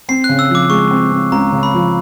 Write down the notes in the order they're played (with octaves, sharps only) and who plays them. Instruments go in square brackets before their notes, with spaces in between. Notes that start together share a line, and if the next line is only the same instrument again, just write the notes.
[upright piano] C4 [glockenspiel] C7
[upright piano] C#3 [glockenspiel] F#6
[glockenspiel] E6
[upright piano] F3
[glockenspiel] D6
[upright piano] G#3 [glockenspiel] C#6
[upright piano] C4
C4
[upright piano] C#2 [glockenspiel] A#5
[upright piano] C#3
[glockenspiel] B5
[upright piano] F3